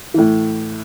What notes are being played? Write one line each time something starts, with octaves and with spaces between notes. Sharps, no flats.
A2 E3